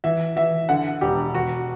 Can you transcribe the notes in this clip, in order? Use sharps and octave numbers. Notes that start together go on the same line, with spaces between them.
E3 E5
E3 E5
D3 F#5
E1 G4
E1 F#4